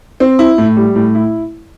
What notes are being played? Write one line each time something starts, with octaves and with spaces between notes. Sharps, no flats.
C4
E4
A2
G3
A2
E4